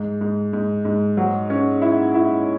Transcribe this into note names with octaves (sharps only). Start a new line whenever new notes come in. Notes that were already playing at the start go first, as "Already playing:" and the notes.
Already playing: G#2
G#2
G#2
G#2
F#3
C#4
E4
E4